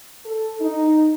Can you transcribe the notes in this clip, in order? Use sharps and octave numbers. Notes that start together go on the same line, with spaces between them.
A4
D#4